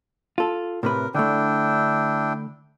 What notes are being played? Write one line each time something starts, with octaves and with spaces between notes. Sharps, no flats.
F4 A4
A2 C3 A#4 B4
D3 A3 D4 E4 G5